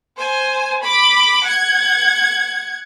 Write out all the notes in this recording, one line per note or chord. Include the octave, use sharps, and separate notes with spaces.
C5 G#5
B5 D6
F#5 G#6